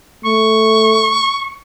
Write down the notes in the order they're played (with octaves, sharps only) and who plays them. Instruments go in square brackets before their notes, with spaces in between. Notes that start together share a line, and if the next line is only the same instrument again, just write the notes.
[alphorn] A3 [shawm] C#6